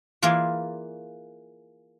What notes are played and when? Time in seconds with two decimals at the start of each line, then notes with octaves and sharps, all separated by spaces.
0.22 E3 A#3 F4 G#4 D5